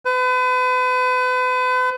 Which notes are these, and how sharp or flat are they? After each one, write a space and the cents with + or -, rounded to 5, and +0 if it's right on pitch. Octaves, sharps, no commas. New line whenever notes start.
B4 +40